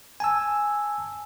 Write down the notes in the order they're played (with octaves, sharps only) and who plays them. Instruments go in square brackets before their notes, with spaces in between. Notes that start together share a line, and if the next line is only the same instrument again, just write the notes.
[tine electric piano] G#5 A5 E6